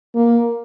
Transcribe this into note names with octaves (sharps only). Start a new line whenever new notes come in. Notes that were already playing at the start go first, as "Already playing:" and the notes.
A#3